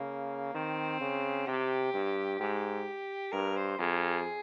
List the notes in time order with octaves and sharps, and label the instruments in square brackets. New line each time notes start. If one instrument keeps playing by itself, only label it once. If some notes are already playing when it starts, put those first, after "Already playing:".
Already playing: [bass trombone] C#3 [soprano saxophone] A#3
[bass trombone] D#3 [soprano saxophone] C4
[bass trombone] C#3
[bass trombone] C3 [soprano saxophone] G4
[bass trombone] G2
[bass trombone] G#2 [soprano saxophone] G4
[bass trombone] G2 [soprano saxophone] A#4
[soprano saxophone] C5
[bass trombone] F2 [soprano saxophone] G#4